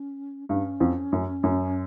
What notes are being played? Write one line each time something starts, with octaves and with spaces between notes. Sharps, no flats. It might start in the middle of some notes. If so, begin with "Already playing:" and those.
Already playing: C#4
G2 C#4
F2
F#2
F#2